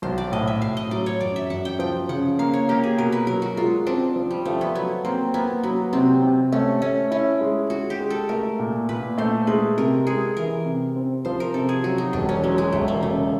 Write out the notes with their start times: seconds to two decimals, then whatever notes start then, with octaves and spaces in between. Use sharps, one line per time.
0.02 B1 C5
0.18 D5
0.32 A2 D#5
0.48 E5
0.62 A2 F5
0.77 D#5
0.91 F#3 D5
1.06 C#5
1.21 F#2 D5
1.36 E5
1.50 F#2 F#5
1.65 G5
1.79 F3 G5
2.09 C#3 F#5
2.39 A#3 F5
2.54 C#5
2.69 A#3 G4
2.84 G#4
2.98 B2 A#4
3.12 B4
3.27 F#3 A#4
3.42 F#4
3.57 G#3 F4
3.87 C4 D4
4.16 F3
4.31 G3
4.45 F3 A3
4.61 B3
4.75 F#3 B3
5.04 A#3 C4
5.34 A#3 B3
5.64 F#3 B3
5.93 C3 C4
6.22 C3
6.52 A3 C#4
6.82 A3 C#4
7.11 C#4 E4
7.41 G#3
7.70 G#3 F#4
7.90 G4
8.00 G#3
8.10 A4
8.29 A3 A#4
8.60 A#2
8.89 A#2 B4
9.18 A3 C5
9.47 G#3 B4
9.77 C3 A#4
10.07 G#3 G#4
10.37 E3 A#4
10.65 C3
10.96 C4
11.25 F3 C5
11.40 A#4
11.54 C3 A4
11.69 G#4
11.84 F#3 F#4
11.98 D#4
12.13 E1 D4
12.29 C#4
12.44 F#3 G#3
12.58 G#3
12.72 E1 A3
12.88 A#3
13.03 C#3 A3